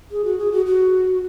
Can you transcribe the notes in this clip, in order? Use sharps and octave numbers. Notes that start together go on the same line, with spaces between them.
G#4
F#4
G#4
F#4
F#4